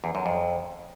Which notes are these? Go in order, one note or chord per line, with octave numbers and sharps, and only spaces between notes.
E2
F#2
F2